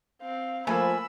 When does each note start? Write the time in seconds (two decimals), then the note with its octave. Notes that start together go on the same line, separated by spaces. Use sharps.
0.22 C4 F5
0.67 F3 A3 A#3 G#5 B5 E6